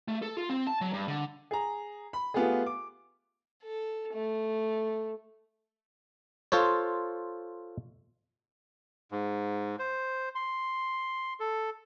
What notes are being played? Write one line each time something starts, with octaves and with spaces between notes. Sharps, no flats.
A3
A4
F4
C4
A5
F#3
G2
D3
G#4 A#5
B5
A3 B3 F4 G4 G#4
D6
A4
A3
F4 A4 C5 C#5
G#2
C5
C6
A4